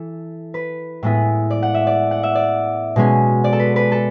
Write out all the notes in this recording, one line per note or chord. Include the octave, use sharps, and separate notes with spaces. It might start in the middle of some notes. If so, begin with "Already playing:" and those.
Already playing: E3 E4 A4
B4
A2 G#3 B3 E4
D5
F#5
E5
D5
F#5
E5
D5
B2 G#3 C#4
D5
A4
B4
B4
A4